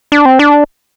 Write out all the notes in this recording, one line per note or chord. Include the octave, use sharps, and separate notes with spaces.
D4
C4
D4